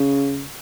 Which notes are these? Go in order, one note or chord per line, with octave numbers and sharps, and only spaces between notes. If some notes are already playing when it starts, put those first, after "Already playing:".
Already playing: C#3